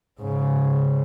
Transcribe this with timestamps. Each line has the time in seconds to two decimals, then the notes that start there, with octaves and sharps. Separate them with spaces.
0.21 G#2 C#3